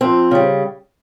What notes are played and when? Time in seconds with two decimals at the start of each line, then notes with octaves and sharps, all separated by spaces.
0.01 F2 C4
0.31 C#3 G3